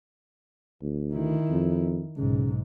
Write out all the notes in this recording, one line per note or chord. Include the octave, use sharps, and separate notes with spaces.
D2
D#3 E4
F2
B1 G#2 C#3